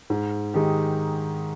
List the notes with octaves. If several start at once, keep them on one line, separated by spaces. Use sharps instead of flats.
G#2
D#3 G#3 D#4 G4